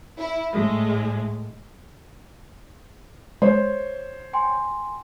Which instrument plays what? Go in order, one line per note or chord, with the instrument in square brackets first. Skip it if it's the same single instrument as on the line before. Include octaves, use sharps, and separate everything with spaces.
[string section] E4
A2 G#3
[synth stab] G#3 [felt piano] C5 C#5
[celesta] G5 G#5 C6